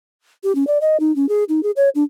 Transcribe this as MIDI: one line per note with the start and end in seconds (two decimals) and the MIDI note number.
0.43 0.55 67
0.55 0.66 61
0.67 0.78 74
0.81 0.97 75
1.00 1.14 63
1.16 1.28 61
1.29 1.44 68
1.49 1.63 63
1.63 1.71 68
1.76 1.89 73
1.95 2.04 62